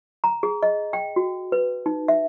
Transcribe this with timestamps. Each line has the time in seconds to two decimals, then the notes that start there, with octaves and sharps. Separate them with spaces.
0.24 A#5
0.43 G#4
0.63 D#5
0.93 G5
1.16 F#4
1.52 B4
1.86 D#4
2.08 E5